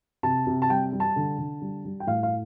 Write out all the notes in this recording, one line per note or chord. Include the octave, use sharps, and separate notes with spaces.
C3 A5
C3
A5
G3 G5
G3
A5
D3
D3
G3
G3
G5
A2 F5
F5